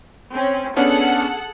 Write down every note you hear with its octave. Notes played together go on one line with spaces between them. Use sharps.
C4 C#4
B3 C#4 D4 G#4 A4 F#5